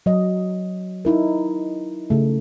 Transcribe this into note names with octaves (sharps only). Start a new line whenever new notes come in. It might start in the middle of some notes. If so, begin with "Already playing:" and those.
F#3 D#5
D#4 E4 A#4
C#3 A3